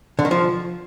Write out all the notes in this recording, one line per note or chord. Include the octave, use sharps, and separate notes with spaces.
D3
D#3
F3